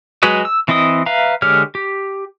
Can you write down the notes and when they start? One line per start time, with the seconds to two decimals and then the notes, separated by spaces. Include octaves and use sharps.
0.23 F#3 G#3 F#4 B4 D#5
0.45 E6
0.68 E3 C4 E4 D#5 D#6
1.06 B4 E5 F5 A#5
1.42 D3 G#3 G4 C#5 F6
1.75 G4